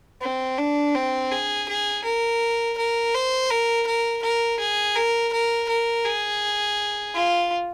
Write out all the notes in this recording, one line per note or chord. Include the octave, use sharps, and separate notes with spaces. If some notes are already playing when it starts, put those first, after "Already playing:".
C4
D4
C4
G#4
G#4
A#4
A#4
C5
A#4
A#4
A#4
G#4
A#4
A#4
A#4
G#4
F4